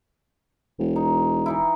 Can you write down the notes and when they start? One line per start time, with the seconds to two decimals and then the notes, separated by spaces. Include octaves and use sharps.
0.79 E1
0.96 D#4
1.46 E3 D#4 E4